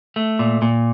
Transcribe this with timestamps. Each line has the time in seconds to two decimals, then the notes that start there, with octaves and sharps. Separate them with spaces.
0.16 A3
0.39 A#2
0.62 A#2